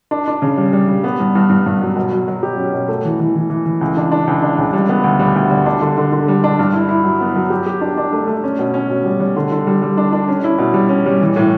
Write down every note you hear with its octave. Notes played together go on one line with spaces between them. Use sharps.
D4
D4
C#3
G3
G3
G3
B3
G2
G2
G2
G2
F#3
B2
F#3
F#3
G4
C#4
B2
A3
E3
E3
E3
E3
E3
C#2
D4
D4
C#2
D4
C#2
G3
B3
D2
G3
D2
G3
D4
D3
D3
D3
G3
D4
G2
E4
E4
F#3
B3
F#3
G4
G4
D4
D4
A3
A3
C#4
B2
C#4
B2
G3
G3
D3
D3
G3
G3
D4
D4
C#4
E4
B2
G3
C#4
G3
E3
A2